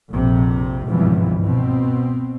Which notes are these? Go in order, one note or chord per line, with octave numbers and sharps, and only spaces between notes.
A#1 F2 C3
G#1 C#2 G2 B2 E3 F3
B2 C4